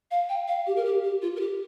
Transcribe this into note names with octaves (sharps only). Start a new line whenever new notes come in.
F5
G5
F5
G4
A#4
G4
G4
F4
A#4
G4